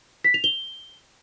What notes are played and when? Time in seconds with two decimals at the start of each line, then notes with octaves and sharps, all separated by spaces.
0.24 B6
0.34 F7
0.44 G7